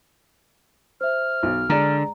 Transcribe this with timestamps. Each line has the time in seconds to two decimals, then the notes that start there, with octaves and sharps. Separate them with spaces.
1.01 C5 E5 F6
1.43 B1
1.70 D3 G#3 D5 A#5